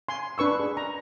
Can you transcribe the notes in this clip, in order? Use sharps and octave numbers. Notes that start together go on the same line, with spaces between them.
G#5 C6
D4 B4 C#6 E6
G#4
A#5